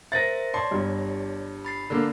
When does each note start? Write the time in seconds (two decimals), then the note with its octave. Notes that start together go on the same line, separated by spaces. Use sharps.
0.12 A#4 C5 E5 A6 A#6
0.54 C#5 D5 A5 C6
0.71 G1 G2
1.65 B5 A6 C7
1.90 D3 A#3